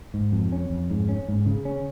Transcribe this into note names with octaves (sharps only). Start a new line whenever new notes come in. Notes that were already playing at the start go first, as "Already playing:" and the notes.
G#2
F2
C#4
F2
G#2
C#4
G#2
C#3
C#4